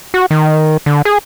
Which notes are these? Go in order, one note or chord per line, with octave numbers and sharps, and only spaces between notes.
F#4
D#3
D3
G#4